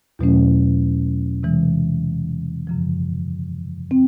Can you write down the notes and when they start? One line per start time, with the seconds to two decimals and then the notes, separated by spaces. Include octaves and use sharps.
0.19 E2 B2 F#3 A3 C#4
1.43 C3 E3 G#3
2.67 F#2 C#3 F3
3.91 C4